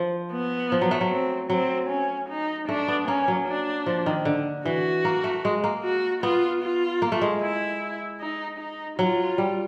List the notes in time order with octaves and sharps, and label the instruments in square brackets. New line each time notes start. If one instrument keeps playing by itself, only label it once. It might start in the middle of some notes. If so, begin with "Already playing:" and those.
Already playing: [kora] F3
[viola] B3
[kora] F3
F#3
A3
F#3
[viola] C4
[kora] F#3 [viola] C4
[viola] C#4
D#4
[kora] A3 [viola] D4
[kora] B3
[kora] A#3 [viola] C#4
[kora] F#3
[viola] D4
[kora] F3
D#3
D3
[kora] E3 [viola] F#4
[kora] A#3
A3
G#3
A#3
[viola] F#4
[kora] B3 [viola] F4
[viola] F4
[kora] A#3
A3
G#3
[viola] E4
D#4
D#4
[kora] F#3 [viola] F4
[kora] G3